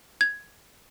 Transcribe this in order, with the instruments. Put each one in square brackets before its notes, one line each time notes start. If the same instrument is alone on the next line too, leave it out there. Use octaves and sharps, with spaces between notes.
[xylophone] G#6